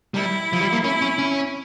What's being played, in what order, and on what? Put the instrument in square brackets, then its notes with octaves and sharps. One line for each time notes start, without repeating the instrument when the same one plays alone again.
[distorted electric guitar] G3 [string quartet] E4
[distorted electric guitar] F3
G3
A#3
[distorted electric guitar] C#4 [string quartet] E4
[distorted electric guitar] C#4
C#4